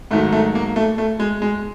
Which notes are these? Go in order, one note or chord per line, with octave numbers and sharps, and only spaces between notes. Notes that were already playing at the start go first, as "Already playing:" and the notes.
G#2 D#3 F#3 A3
A3
A#3
A3
A3
G#3
G#3